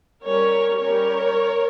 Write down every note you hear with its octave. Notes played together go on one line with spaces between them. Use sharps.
G3 C#4 A#4 C#5
G3 C#4 A#4 C#5